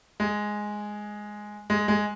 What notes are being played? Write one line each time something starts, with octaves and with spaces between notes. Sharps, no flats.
G#3
G#3
G#3